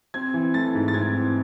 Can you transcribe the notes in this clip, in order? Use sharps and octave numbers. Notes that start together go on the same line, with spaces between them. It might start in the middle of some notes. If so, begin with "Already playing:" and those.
C4 G#6
E3
A3 A6
G#2
A6
C4 G#6
E3